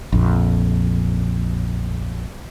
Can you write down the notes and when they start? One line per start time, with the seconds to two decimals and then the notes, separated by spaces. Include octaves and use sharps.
0.12 A#1 F2